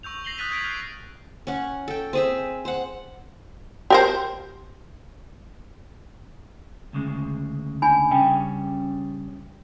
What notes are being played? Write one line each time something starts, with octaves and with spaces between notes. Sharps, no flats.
C#6 E6 G6 F7
A#6 C7 F#7 G7
D#6 F#6 A6 B6 D#7
G6 G#6 D7
F6 C7
C#4 F#5
A4 G5
C4 G#4 E5
C5 F#5
G4 A#4 C5
D2 C#3 G#3
D4 G#5 B5
C#3 G3 C#4 G5